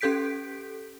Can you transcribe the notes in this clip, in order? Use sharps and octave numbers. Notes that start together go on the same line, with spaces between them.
C#4 G4 A4 G6 B6 D7